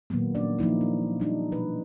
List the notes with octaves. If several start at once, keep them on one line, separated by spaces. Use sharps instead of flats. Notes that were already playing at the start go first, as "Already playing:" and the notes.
A#2 D#3 F#3 A#3 B3
F3 A#3 C#4 D4 D5
F3 A#3 D#4 E4
D4
G3 D4 D#4
B2 F3 B4